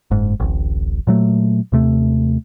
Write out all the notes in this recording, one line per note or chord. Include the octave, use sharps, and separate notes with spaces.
F#1 G#2
D1 A1
A#2 F#3 A3
D#2 C3 A3